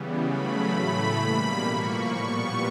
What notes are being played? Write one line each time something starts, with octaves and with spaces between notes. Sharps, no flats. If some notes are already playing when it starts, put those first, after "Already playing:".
Already playing: C#3 E3 G3 B3
C#3 F#3 A3 B5
A2 E3 A3
B2 G3 A#3
A2 F3 A#3 C#6
A#2 G3 B3